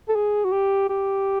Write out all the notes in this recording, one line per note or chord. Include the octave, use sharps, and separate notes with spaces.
A4
G#4
F#4
G4
G4